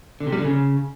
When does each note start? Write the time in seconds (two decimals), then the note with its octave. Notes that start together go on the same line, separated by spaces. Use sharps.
0.20 D3
0.27 C3
0.33 G3
0.39 D3
0.45 C#3